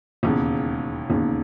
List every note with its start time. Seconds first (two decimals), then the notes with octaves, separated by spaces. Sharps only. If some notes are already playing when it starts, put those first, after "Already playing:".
0.23 E1 D#2 C#3
1.10 E1 D#2 C#3